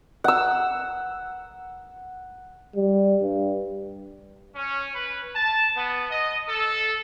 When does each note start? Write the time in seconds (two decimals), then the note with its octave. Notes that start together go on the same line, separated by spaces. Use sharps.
0.24 F#5 E6
2.76 G3
3.22 G2
4.56 C#4
4.93 B4
5.35 A5
5.76 B3
6.10 D#5
6.48 A4